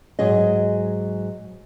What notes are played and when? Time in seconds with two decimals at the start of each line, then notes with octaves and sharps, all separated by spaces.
0.19 G#2 F#3 G#4 D#5